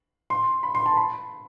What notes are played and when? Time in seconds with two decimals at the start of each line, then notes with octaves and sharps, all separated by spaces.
0.30 C6
0.63 B5
0.75 C6
0.86 A5
0.97 B5